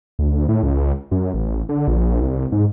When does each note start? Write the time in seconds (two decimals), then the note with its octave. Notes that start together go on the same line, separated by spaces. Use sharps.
0.19 D2
0.49 A2
0.63 C#2
1.12 F#2
1.34 A1
1.69 D3
1.88 A#1
2.21 C2
2.52 G#2